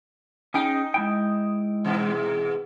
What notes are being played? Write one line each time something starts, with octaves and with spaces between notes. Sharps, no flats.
C#4 D#4 G#4 G5
G#3 E4 G5
G#2 B2 E3